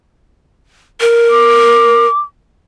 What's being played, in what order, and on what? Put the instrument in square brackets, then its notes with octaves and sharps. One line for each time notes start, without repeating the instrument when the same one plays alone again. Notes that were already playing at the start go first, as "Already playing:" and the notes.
[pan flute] A#4
[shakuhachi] D6